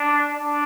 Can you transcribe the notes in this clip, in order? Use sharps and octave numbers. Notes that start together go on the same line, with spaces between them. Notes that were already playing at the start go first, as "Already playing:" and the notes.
Already playing: D4
D4